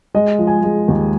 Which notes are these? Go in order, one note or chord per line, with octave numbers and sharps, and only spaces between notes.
G#3 D#5
F3
G#5
G#3
D#2